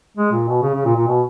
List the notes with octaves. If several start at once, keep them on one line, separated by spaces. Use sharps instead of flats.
G#3
A#2
B2
C#3
C#3
A#2
A#2
B2